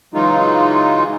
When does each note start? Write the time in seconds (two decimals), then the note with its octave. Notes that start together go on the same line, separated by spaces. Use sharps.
0.14 C#3 E3 F#3 G#3 D#4 F4